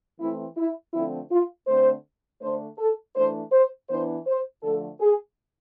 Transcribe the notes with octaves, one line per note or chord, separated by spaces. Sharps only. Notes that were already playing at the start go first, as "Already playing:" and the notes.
E3 A3 C4 E4
E4
D3 F3 A3 C4 E4
F4
D3 A3 C4 C5
D3 A3 D4 C5
A4
E3 A3 D4 C5
C5
E3 B3 D4 C5
C5
D3 F3 A3 A4
G#4